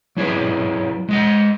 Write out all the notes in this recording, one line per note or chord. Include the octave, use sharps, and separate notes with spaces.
F#3 E4 G#4 B4
G#3 D#5 F#5